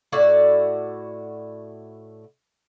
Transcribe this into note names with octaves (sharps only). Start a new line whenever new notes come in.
A2 E4 F#4 D5